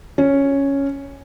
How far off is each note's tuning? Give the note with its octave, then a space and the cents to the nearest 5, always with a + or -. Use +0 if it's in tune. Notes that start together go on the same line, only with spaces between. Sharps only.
C#4 +0